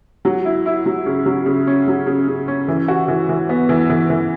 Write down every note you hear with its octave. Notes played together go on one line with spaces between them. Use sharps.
F#3
E4
E4
F#3
C#3
F#3
C#3
C#4
F#3
C#3
C#3
C#4
E3
F#4
E3
E3
B3
E3
E3
E3